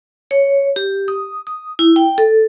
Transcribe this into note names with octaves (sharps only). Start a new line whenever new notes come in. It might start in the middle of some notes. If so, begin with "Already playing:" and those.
C#5
G4
D#6
D#6
E4
G5
A4